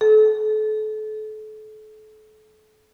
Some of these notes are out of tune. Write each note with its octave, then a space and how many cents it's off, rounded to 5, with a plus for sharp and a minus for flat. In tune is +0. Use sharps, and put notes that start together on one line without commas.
A4 -35